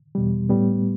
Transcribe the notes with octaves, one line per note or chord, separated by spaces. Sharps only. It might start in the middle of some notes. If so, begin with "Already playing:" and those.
E2 B2 G3
A2 G3 B3